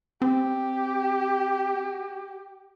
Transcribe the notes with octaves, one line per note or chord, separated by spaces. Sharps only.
C4 G4